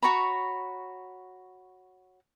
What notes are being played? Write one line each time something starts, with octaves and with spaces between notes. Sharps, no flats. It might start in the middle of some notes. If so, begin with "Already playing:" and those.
F#4 C#5 A#5 B5